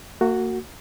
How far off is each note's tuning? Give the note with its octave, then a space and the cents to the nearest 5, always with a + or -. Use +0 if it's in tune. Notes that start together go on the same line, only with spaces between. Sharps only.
A#3 -35 F#4 +0